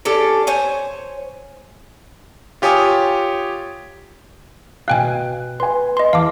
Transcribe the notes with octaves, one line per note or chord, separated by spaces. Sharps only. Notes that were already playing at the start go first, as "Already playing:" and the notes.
C#4 D4 G4 A4
C5 C#5 G#5
F4 G4 C#5 G#5 D#6
B2 F5 G5 G#5 F#6
B4 G#5 C6
D#5 C6
E2 F5 A5 D6